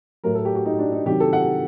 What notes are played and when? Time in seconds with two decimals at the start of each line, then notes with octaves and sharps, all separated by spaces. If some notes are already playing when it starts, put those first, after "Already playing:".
0.24 A2 F#3 A#4
0.35 A4
0.45 G4
0.55 F#4
0.66 D#4
0.79 D4
0.92 D#4
1.06 C3 D#3 F#3 G4
1.20 A4
1.33 F#5